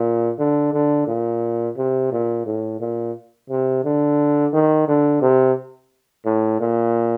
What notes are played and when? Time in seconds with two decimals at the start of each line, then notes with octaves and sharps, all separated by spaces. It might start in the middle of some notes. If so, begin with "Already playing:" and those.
Already playing: A#2
0.39 D3
0.73 D3
1.07 A#2
1.77 C3
2.12 A#2
2.46 A2
2.81 A#2
3.50 C3
3.84 D3
4.53 D#3
4.88 D3
5.22 C3
6.25 A2
6.61 A#2